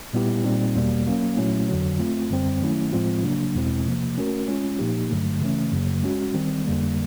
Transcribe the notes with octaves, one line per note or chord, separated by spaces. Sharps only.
A#2 G3 B3 E4 G4
A#2 G3 C4 D#4
E2 B2 G3 A#3
F#3 A#3 C#4
A#2 F#3 A3 C#4 E4
F2 D3 F#3
A3 C4 F4
F#2 D3 G3 C4
D#3 F#3 A3 C#4 E4
A2 F3 G#3 C4 F4
C#3 F#3 A#3 D4
E2 B2 G#3 C4 E4
C3 F3 A#3
A3 C#4 F#4 A#4
G#3 C#4 F4
A#2 F3 A#3 D#4 G4
G2 D3 F#3 A3
C#3 E3 A3 C#4
F#2 C#3 F#3 A#3
G#3 C#4 F#4
D#3 G3 C4
F2 D3 G3 A#3